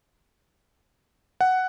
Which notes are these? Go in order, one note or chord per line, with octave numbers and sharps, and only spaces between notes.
F#5